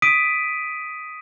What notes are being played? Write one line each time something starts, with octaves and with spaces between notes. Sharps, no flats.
D#6 B6 D7 D#7